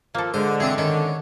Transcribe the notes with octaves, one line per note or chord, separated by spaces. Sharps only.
F3 A#3 A4
D3 G#3 C5
E3 C4 D4 G#4
D#3 C#4